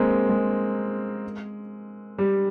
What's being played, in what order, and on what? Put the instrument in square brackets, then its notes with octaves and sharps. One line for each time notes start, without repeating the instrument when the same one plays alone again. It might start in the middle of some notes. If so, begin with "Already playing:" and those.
Already playing: [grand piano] G#3 A#3 C4
G#3
G3